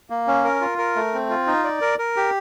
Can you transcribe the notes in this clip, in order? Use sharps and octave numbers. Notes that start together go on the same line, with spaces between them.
A#3
C#4
A#4
F4
A#4
A3
C4
F4
D#4
D5
A#4
A#4
G4